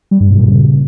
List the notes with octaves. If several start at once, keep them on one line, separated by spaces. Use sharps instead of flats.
G3
G2
B2
A#2
C#3